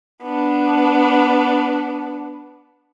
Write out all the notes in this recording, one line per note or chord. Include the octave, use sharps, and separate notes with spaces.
B3 D4